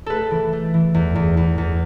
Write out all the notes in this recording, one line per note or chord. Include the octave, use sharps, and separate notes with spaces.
A3 A4 B4
E3
A3
E3
E2
E2
E2
E2